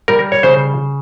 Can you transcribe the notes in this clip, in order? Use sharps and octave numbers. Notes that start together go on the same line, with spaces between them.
G3 A#4
C#5
C#3 C5